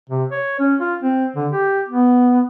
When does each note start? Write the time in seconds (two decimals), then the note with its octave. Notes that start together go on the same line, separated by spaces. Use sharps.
0.09 C3
0.31 C#5
0.59 C#4
0.80 F4
1.03 C4
1.36 D3
1.51 G4
1.88 B3